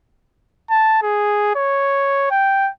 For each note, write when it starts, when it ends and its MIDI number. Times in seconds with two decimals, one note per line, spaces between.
0.70 0.97 81
1.03 1.52 68
1.55 2.28 73
2.30 2.70 79